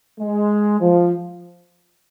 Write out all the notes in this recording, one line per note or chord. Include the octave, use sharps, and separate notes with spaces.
G#3
F3